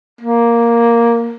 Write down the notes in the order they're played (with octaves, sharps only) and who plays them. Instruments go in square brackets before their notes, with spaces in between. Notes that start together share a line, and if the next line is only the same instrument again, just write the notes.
[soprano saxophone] A#3